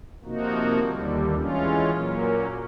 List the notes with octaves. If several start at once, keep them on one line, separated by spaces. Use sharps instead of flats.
C3 F3 A#3 D#4 F#4
D#2 D3 G3
E3 G#3 C#4 F4
A#2 F#3 A#3 C#4